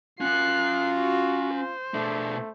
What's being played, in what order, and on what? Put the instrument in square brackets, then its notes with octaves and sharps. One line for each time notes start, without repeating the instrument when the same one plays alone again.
[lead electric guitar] C#4 F#5 [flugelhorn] F4 [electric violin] F#6 C7
[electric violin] F#4
C5
[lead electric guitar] B2 D4 [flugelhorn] A3